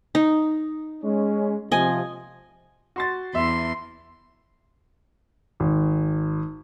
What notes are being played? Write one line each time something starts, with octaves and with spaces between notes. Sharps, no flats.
D#4
G#3 C#4
C3 F3 D#5 G#5
F#4 C6 A6
E2 E5 C6
G#1